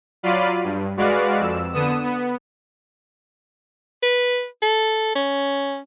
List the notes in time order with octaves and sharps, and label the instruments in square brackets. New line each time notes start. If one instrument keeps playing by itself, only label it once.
[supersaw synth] F#3 F4 D5 F5 B5 D#7
G2
G#3 F#4 B4 D5 F5
F2 E6
D3 B3 D#6 E7
B3
[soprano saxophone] B4
A4
C#4